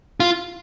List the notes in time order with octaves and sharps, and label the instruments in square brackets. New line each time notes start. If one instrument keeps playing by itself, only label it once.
[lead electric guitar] F4